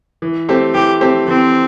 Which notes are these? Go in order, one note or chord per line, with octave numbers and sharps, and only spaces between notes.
E3
A3 C4 G4 C5
E3 G4
A3 C4 G4 C5
E3 C4